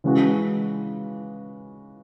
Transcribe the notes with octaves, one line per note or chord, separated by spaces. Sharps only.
C#3 E3 G#3 C#4 F#4